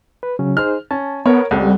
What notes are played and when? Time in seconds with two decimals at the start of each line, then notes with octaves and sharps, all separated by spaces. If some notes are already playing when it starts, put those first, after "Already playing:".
0.23 B4
0.39 C#3 F#3 C#4
0.57 D#4 G#4 C5 F6
0.91 C#4 A5
1.26 B3 A#4 C#5
1.51 C#2 G3 C4 A4 F#5